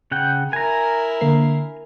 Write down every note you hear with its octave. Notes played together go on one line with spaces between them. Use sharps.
C#3 F#5 G5
E4 A#4 G#5 A#5
D3 A#3 C7